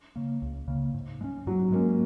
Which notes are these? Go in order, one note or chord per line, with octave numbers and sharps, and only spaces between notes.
C#3 A#3
C#2
C#3 A#3
G#2
G#3
C#4
G#2 F#3
G#3 A#3 C#4